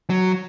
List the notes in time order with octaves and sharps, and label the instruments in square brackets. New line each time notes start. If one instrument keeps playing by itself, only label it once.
[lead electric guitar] F#3